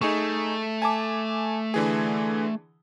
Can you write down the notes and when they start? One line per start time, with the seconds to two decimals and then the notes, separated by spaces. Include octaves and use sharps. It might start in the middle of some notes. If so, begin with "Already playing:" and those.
0.01 A3 D#4 G#4 C#6
0.82 G#5 A5 D6
1.74 D3 E3 G#4